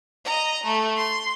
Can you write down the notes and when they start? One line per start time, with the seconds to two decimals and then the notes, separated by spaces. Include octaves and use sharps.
0.25 D#5 A#5
0.64 A3
0.97 C6